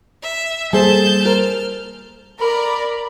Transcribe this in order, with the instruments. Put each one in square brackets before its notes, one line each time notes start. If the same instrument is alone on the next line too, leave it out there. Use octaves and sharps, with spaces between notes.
[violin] E5
[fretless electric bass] G3 A#3 [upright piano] G#4 A4 C5 [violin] A5 G6
[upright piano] A#4 C5 [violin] F6
[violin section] A#4 D5 [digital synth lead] B5